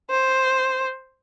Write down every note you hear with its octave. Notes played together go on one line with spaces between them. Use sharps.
C5